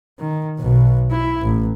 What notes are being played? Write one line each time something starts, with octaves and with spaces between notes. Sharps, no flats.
D#3
B1 B2
E4
A1